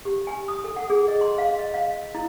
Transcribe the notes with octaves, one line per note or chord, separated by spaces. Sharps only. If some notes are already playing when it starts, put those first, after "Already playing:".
G4
G#5
D#6
A4
F#5
G#4
D#5
C6
F5
D#5
F5
E4